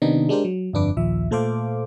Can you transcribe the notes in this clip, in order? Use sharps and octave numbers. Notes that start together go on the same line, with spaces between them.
C3 D#3 B3 C4 D4 D#4
G#3 D4 G4 A#4 C5
F#3
G1 F2 D4 B4 D6
A#1 D#2 F3 E5
A#2 A3 A4 C5 F5 D6